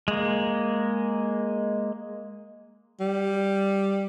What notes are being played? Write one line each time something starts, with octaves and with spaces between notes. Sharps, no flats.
G#3 A#3
G3